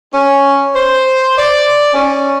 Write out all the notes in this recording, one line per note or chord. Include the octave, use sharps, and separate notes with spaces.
C#4
C5
D5
C#4